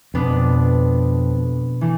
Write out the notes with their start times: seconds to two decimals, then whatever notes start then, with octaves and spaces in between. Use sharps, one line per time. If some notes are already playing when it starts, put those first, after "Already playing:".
0.14 F2 B2 B3 D4
1.81 E3 A3